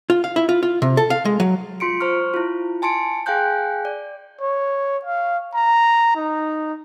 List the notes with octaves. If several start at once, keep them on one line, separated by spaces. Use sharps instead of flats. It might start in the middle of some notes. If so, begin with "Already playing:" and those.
F4
F5
E4
F4
F4
C3
A4
F5
G#3
F#3
F4 C6 C#7 D7
C5 A#5 C#6 F6
E4 F4
G#5 A5 C6 C#7 D7
G#4 F5 G5 G#5 F#6 G6
D5
C#5
F5
A#5
D#4